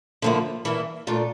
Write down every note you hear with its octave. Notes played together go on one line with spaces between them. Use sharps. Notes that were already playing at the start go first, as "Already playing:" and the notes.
D3 F3 A#3 E4
G2 E3 A#3 E4
A#2 A3 D4 F4